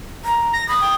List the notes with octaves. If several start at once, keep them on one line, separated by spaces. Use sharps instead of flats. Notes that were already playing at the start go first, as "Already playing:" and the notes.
A#5
A#6
B5 D#6
G5